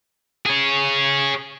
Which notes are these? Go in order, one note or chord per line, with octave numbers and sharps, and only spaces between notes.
G#4 C#5